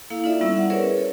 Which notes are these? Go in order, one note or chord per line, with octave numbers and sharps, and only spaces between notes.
A#3 E4 A4 F5
D#4 F4 A4 D5 E5
G3 B3 C#4 E4 E5 E6
F#5
C#4 G#4 A#4 B4 C#5 D5
A4 C#5